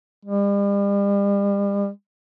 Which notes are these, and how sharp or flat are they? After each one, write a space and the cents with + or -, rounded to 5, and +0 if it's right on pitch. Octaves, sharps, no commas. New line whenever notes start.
G3 +40